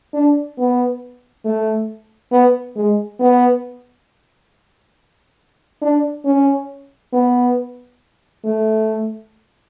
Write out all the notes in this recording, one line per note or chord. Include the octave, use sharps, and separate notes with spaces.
D4
B3
A3
B3
G#3
B3
D4
C#4
B3
A3